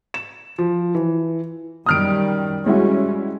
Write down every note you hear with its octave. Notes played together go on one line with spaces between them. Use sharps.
E7
F3
E3
F#2 D#3 G3 D#6 F6 D7
G3 G#3 C#4 E4 F#4